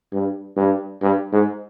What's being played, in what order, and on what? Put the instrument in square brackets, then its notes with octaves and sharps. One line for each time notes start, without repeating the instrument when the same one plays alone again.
[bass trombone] G2
G2
G2
G#2